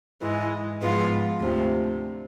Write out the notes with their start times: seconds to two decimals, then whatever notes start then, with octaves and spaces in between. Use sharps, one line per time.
0.22 G#2 E3 G#3
0.81 G#2 F3 G#3 B3 F4
1.40 D2 C3 F3